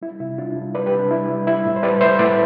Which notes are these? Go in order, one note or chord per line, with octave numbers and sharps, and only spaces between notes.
G3 E4
C3 E4
G3 D4 F4
G3
G3 B4 D5
G4 B4
C3
D4
G3 E4
G3
G3 E4
A2
C5
G3 B4 D5
A2 C5 E5
A2 B4 D5